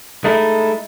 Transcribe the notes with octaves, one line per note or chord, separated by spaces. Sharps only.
G#3 A3 D#4 E4